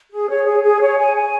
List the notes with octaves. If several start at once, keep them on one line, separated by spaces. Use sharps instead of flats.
G#4
C#5
G#4
G#4
C#5
G#5
G#5